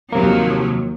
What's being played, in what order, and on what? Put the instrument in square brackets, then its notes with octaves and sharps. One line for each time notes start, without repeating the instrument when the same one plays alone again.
[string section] D#2 F3 F#3 [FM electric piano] C3 A#3